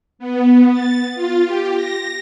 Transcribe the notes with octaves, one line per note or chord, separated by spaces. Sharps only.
B3
A6
F4
G4
A#6